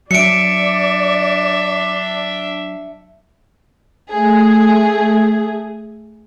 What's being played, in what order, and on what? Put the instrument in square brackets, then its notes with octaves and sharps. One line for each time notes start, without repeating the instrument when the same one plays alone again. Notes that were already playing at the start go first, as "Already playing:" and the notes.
[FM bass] F#3 [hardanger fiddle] D4 E5 [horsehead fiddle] D5 [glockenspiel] C#7 D7
[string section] A3 G#4